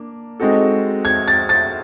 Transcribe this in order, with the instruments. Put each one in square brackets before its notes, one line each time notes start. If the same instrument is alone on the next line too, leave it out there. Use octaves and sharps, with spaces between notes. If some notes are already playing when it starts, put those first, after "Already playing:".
Already playing: [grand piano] A#3 D4
G#3 C4 D#4 F#4 A4
[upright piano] G#6
A6
A6